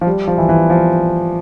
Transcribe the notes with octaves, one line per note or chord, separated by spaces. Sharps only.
F3
G3
F3
E3
E3
F3